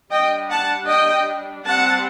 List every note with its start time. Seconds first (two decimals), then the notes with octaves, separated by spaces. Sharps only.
0.11 G3 D4 D#5 G5
0.50 F#5 A5
0.88 D#5 G5
1.65 G3 C4 F#5 A5